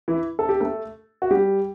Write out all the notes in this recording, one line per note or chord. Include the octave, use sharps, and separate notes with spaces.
E3 E4
A4
G4
A3 A4
F#4
G3 G4